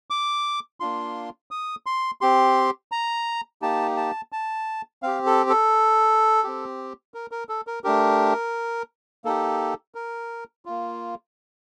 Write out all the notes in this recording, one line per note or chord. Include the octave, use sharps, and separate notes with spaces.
D6
A#3 D4 F4 C6
D#6
C6
C4 G4 C6
A#5
A#3 D#4 G4 A5
A5
A5
C4 G4 F5
A4
A4
C4 G4
A#4
A#4
A4
A#4
A3 D4 G4 A#4
A#3 D#4 G4 A4
A#4
A#3 F4